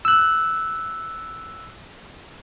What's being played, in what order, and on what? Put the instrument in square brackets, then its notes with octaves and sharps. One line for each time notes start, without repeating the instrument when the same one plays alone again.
[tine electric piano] E6 F#6